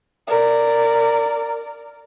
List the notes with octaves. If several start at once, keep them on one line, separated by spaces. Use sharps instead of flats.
A#4 D5